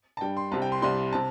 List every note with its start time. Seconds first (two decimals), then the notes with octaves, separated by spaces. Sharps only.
0.17 A5
0.21 G2 G3 G5
0.37 C6
0.51 C2 C3 G3 A5
0.62 G5
0.72 C6
0.82 C2 C3 G3 C6
1.13 C3 A5